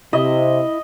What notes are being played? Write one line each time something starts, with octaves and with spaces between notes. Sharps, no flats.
C3 E4 D#5